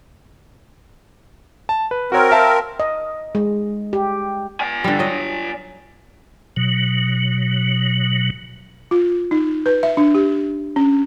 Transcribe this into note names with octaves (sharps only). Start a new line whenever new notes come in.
A5
B4
C4 F#4 A#4 C#5
E5 F5 A5
D#5
G#3
G4
D5 G#5
D3 G3
F#3 D#5
B2 F#3
F4
D#4
B4
E5
D4
G4
C#4